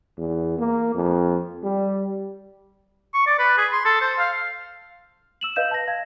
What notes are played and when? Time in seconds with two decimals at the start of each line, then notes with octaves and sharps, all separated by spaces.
0.18 E2
0.59 A#3
0.94 F2
1.63 G3
3.14 C#6
3.27 D5
3.39 B4
3.58 G#4
3.72 C6
3.85 A4
4.01 C5
4.19 F5
5.41 E6 E7 F#7
5.56 B4 D#5 F5 G6 E7
5.71 A5 A#6
5.88 F5 G#6